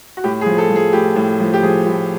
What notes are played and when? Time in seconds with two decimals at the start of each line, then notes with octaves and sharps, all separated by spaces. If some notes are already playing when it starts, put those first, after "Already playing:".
0.17 F#4
0.24 A2 G4
0.41 G#4
0.46 F3
0.58 A4
0.70 F3
0.76 G#4
0.93 A2 G4
1.16 A2
1.40 F3
1.54 G4
1.63 F3 G#4
1.87 A2